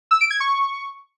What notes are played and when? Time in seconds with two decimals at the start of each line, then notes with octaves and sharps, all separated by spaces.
0.11 E6
0.21 D7
0.31 G#6
0.40 C#6